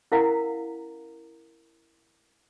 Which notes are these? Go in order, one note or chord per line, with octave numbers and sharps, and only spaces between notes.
C#4 E4 A#4 F5 F#5 A#5